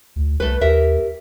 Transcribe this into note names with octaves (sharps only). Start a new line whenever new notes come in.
D2
C2 A3 B4
D#2 G4 A#4 E5